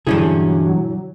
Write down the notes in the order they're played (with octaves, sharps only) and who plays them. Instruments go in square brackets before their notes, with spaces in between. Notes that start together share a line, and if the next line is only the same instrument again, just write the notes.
[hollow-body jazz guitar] G2 C#4 G#4 [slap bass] B2 E3 [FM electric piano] D3 E4 [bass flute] F#3